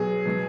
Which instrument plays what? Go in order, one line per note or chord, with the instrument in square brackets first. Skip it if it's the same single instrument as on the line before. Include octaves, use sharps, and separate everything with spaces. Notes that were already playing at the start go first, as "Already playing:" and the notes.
Already playing: [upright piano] B2 F#3 G#4
B2 F#3